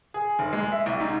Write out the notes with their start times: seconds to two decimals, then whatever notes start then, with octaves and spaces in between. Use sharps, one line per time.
0.14 G#4
0.39 F1
0.53 G#3
0.72 E5
0.86 C2
1.00 G#2